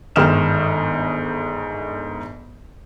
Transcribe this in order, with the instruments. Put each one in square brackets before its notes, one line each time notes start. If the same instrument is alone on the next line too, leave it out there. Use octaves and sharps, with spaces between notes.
[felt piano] G1 G#2 D#3 D#6 F6 E7